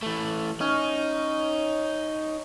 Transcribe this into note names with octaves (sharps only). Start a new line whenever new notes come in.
E3 A3
C#4 D#4